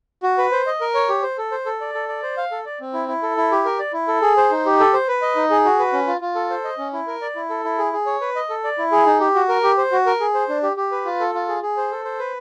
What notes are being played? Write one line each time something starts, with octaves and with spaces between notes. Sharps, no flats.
F#4
B4
C5
D#5
A#4
C#5
G4
C5
A4
C5
A4
D5
A4
D5
C5
F5
A4
D5
C4
E4
E4
A4
E4
G4
A#4
D5
E4
A4
G#4
C5
D#4
G4
A4
C5
B4
D#5
D#4
G#4
F#4
B4
C#4
F4
F4
A4
C5
D#5
C#4
E4
A#4
D5
E4
A4
E4
G#4
G#4
C#5
B4
D#5
A4
D5
E4
G#4
D#4
G4
F#4
A#4
G4
C5
F#4
A#4
G#4
C5
D4
G4
G4
B4
F4
A4
F4
G#4
G#4
C5
A4
C5
B4